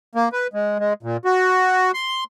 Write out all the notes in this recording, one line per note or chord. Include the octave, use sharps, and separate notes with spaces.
A#3
B4
G#3
G#3
A#2
F#4
C6